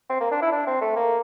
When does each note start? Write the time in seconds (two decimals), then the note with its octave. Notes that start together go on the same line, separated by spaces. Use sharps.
0.10 C4
0.21 A#3
0.31 D4
0.42 E4
0.52 D4
0.67 C4
0.81 A3
0.96 A#3